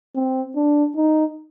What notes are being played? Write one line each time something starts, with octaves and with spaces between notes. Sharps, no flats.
C4
D4
D#4